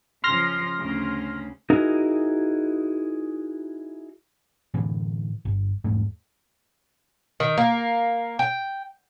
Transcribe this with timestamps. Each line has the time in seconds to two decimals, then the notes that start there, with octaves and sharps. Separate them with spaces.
0.24 C#3 F3 C6 F6 A#6
0.79 D2 C#3
1.70 D#4 E4 F#4 G#4 A#4
4.74 A2 D3 E3
5.45 G1
5.84 E2 G#2 A3
7.40 D#3
7.57 A#3
8.39 G5